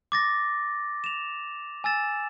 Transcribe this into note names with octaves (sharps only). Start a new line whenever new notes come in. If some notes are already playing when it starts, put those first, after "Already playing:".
D6 A6 A#6
E7 F7
G#5 E6 A6 E7